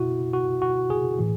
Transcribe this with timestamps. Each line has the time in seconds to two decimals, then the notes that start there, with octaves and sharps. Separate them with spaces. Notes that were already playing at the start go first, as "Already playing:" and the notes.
Already playing: B2 E4 F#4
0.33 F#4
0.62 F#4
0.90 G#4
1.19 A2 E3